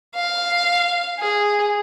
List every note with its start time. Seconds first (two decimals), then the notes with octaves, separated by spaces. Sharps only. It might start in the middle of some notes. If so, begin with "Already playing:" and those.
0.15 F5
1.19 G#4